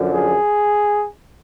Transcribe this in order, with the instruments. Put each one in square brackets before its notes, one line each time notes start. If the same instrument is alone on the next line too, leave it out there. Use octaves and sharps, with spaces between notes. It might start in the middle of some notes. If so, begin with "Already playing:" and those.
Already playing: [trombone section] F#2 D3 F3
G#4